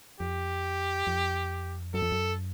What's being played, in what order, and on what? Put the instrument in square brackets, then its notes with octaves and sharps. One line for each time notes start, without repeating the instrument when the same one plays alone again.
[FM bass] F2 [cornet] G4
[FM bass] F2
[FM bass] F#2 [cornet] A4
[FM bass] F2
F#2